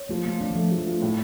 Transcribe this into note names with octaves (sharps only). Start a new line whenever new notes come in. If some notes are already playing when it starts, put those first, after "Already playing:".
Already playing: C#5
F3 A3
A#3 F4
A3 D4
E3
F3 A3
F3
A3
F4
A2